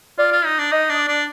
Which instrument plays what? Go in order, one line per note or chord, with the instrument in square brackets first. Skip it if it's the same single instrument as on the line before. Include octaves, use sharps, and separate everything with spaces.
[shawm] F4 [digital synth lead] D5
[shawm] F4
D#4
D4
[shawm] D#4 [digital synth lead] D#5
[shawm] D4 [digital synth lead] D#5
[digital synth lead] D5
[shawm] D4